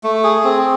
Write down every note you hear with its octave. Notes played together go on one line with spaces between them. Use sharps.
A3
G#4
C4